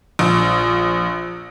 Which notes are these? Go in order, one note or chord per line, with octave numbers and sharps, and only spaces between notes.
A#1